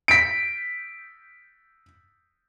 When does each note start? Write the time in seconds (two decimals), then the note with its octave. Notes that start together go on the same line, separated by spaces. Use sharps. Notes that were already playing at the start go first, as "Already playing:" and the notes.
0.08 B6 D7